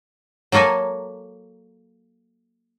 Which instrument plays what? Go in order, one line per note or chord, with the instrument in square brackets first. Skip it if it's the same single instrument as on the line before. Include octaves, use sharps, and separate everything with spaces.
[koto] F#3 A#3 A4 A#4 G#5